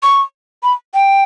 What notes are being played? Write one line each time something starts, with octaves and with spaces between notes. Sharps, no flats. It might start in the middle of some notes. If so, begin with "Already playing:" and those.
C#6
B5
G5